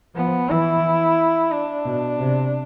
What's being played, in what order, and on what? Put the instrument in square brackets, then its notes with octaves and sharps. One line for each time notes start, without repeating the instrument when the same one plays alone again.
[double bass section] F3 [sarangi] B3
[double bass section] E3 [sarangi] E4
[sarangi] D4
[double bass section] B2
C3